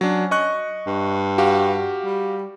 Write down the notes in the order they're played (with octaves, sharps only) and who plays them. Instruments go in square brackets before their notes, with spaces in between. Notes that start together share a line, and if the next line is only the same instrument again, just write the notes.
[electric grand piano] F#3 D4 [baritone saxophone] C#4
[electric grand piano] D#5 C#6 F#6
[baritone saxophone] G2
[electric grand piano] F#4 G4 F5
[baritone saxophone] G3